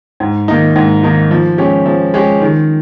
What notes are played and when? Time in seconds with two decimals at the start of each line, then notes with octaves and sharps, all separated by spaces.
0.20 G#2
0.48 D#3 A#3 D#4
0.76 G#2
1.03 D#3 A#3 D#4
1.31 F3
1.58 G#3 C#4 G4
1.86 F3
2.14 G#3 C#4 G4
2.41 D#3